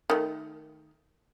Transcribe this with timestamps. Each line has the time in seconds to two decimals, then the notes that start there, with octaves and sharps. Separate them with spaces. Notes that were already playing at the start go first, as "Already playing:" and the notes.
0.10 D#3 A3